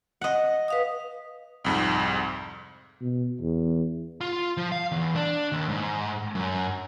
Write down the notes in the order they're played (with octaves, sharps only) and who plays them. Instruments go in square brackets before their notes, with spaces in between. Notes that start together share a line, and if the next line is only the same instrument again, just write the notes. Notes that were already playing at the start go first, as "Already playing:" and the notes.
[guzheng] D#5 F#5
[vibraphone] B4 F5 D#6
[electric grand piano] C2 F2 G#2
[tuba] B2
E2
[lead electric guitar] F4
F3
F5
E2
D4
D#2
G#2
F#2